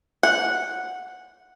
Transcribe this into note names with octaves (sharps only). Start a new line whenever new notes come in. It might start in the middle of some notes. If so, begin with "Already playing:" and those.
F#5